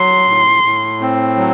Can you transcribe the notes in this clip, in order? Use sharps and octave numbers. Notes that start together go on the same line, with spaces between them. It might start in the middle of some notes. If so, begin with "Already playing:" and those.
Already playing: F#3 C6
A2
A2
C4
F#3